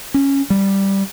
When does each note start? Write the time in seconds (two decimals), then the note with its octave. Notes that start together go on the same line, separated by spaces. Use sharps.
0.14 C#4
0.50 G3